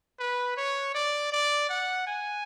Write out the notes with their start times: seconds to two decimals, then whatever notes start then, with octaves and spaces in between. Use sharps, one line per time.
0.19 B4
0.57 C#5
0.95 D5
1.32 D5
1.69 F#5
2.07 G#5